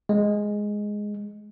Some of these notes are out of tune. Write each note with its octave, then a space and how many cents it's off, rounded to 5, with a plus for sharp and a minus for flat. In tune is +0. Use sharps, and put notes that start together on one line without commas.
G#3 +0